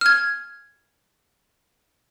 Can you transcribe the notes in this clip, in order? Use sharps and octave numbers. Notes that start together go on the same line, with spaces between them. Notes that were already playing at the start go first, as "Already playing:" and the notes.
F6 G#6